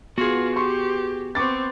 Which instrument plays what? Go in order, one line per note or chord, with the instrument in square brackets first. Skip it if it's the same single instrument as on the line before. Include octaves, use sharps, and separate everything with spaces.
[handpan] B3 [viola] F4 [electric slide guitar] F#4 G#4
[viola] G4 [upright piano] C6 C#6
[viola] B3 C4 [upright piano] C#6 D6 A6